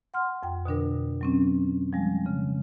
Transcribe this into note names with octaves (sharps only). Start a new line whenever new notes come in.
F#5 C6 F6
F2 G5
B2 D3 D4 A#4
F#3 C4 C#4
F3 G3 G#3
C#3